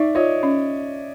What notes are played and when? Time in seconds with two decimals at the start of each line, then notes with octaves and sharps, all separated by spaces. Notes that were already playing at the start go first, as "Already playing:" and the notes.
Already playing: D#4 D5 E5
0.15 F4 C#5 D#5
0.43 C#4